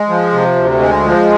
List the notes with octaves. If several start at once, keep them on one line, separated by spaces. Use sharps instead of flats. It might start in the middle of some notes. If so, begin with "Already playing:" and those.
Already playing: G#3
F3
C3
D2
G#3
F3